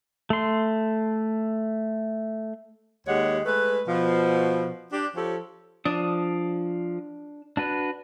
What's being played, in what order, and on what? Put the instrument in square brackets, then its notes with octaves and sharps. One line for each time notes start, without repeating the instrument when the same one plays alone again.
[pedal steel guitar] A3 C6
[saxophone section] D#2 G#3 G4 C#5 F#5
G#3 A3 B4
B2 F3
D4 G4
F3 G4 A4 C#5
[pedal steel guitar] F3 D#6 [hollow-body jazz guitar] D4
[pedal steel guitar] D4 F#4 B4